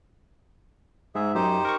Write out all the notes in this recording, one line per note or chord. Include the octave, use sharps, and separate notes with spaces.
G#2 G#4 E5
F#2 D#4 G4 C5
A#4 C#6